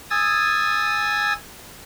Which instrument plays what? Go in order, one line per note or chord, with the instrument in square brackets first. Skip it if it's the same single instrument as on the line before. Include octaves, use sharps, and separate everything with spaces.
[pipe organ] G#5 D#6 E6 G#6 A6